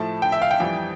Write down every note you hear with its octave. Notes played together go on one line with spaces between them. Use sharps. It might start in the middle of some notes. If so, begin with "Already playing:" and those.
Already playing: A2 F3 A3 A5
G5
E5
F5
G5
F2 E3 G3